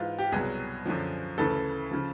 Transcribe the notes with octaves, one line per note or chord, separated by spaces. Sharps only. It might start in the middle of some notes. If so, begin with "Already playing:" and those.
Already playing: G#2 E3 F4
G4
C2 B2 F#3 G#4
F#2 D3 F3
D2 C#3 E3 A4
C#3 F3